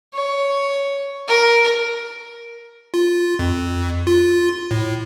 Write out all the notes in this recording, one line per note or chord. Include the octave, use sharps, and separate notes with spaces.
C#5
A#4
F4
F2
F4
A2